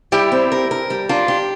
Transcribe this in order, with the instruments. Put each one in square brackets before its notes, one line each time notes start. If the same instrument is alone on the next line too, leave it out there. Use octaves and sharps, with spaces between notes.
[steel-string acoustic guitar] G3 [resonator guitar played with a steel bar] E4 G4
[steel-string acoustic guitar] C4
A#4
A#4
G3
[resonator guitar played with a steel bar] D4 F4 [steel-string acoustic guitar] A#4
[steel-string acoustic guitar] G4